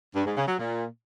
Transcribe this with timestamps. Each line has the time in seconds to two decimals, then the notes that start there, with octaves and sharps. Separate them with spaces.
0.15 G2
0.26 G#2
0.37 C#3
0.48 F#3
0.58 A#2